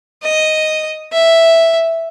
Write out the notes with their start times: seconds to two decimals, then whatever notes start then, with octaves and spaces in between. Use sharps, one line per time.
0.23 D#5
1.12 E5